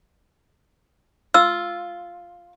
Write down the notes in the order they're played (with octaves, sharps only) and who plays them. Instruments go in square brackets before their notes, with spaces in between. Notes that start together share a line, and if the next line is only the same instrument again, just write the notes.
[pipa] F4 [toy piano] E6